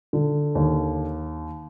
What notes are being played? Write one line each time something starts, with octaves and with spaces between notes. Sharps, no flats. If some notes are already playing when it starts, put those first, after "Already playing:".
D3
D#2